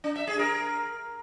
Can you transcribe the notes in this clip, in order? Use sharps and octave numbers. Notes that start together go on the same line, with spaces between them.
D4
E5
G#4
A#4